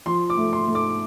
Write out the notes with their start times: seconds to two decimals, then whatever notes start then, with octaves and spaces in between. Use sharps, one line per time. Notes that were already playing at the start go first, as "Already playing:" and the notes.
0.06 F3 C6
0.30 D6
0.37 A3
0.53 C6
0.68 A3
0.75 D6